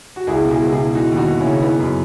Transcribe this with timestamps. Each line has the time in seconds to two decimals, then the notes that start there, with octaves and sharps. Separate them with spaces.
0.16 F#4
0.27 C#2 E4 G#4
0.45 B2
0.50 E4 G#4
0.62 C#2
0.72 E4 G#4
0.79 B2
0.95 E3 D#4 F#4
1.12 D#2
1.17 D#4 F#4
1.28 D#2
1.40 C#4 E4
1.46 C#3
1.62 E3 B3 D#4
1.79 F#2